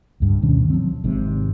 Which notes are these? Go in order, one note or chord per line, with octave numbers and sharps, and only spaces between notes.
C#2 G2
D2 B2 D#3 C#4
F3 F#3 C4
G#1 G#2 C3